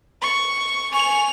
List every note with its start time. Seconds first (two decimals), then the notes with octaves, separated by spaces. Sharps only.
0.22 C#6
0.94 G#5 C#6 F7